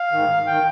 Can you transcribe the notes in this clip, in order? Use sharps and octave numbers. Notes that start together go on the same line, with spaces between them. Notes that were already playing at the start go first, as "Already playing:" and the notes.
Already playing: F5
G#2 D#3
D#3 G5